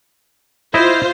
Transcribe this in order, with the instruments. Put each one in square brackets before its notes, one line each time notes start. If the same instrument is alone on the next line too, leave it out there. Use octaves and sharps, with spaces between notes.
[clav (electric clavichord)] E4 D#5 [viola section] F4 C5